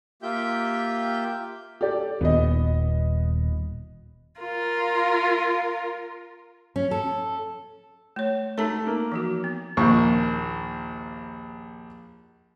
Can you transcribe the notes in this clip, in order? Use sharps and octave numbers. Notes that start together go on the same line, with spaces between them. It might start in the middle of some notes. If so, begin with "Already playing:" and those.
A#3 F4 G4 E5 G5 G6
G4 A4 D5
D#1 B3 D#5
F4 A#4
C#4
A4
A3 C#5
A3 D#4 A5 A#5
A#3
E3 F3 F#4
B3
A#1 D#2 C#6